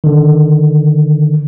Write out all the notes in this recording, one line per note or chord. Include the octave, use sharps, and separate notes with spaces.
D3 D#3